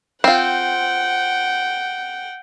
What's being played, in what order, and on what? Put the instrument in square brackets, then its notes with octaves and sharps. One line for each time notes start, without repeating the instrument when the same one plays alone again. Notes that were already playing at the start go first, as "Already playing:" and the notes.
[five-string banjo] C4 F4 [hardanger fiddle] F#5 G5